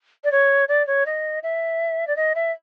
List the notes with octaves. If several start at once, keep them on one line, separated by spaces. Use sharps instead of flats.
D5
C#5
D5
C#5
D#5
E5
D5
D#5
E5